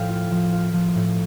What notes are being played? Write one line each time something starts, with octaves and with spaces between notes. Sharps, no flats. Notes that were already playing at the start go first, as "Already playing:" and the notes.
Already playing: A2 F3 F5 G5
F4
F3
F4
F3
A2